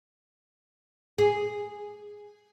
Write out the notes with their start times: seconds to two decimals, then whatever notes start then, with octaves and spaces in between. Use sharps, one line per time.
1.18 G#4